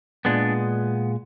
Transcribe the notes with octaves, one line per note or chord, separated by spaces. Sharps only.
A#2 G#3 B3 D4